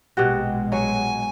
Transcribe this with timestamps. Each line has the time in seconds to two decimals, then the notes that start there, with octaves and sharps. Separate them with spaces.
0.17 A#1 B2 G#3 F#4 G4
0.72 F#3 F#4 C#5 G#5